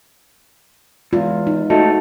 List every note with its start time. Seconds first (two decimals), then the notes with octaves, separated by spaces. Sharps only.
1.13 E2 G#3 F4
1.47 D#4
1.70 A3 D#4 F#4 A4